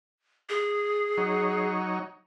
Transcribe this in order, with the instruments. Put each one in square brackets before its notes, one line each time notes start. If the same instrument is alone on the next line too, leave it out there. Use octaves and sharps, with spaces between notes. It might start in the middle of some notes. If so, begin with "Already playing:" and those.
[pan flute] G#4
[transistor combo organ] F#3 D#4 C#5